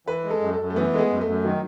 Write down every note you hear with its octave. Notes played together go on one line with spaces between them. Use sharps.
E3 B4
G#3
A4
F#2
A4
F#2
A3
E3 B3
G#3 A3
B3
F#2
A3
F#2
D#3 F#3